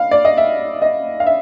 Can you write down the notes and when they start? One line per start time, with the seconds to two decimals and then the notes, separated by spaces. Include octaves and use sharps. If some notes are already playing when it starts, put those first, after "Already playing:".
Already playing: F5
0.11 D5
0.25 D#5
0.37 E5
0.82 D#5
1.20 F5
1.26 E5